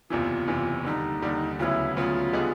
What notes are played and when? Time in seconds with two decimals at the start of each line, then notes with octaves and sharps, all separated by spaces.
0.10 F#1 E2 C3 E3 F4
0.47 F#1 E2 C3 E3
0.84 D#2 D3 G3 D#4
1.22 D#2 D3 G3
1.59 D2 C#3 F#3 B3 E4 F4
1.97 D2 C#3 F#3 B3 F4
2.33 D3 G3 B3 D#4 G#4